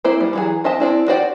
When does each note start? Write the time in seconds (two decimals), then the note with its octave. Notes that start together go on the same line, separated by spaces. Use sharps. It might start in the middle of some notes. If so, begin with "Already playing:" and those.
0.05 A#3 C4 E4 C5
0.20 G3
0.33 E3 F#3 G#4
0.64 C4 D#5 E5 A5
0.80 C4 D4 E4
1.08 F#4 G4 C5 D5 G5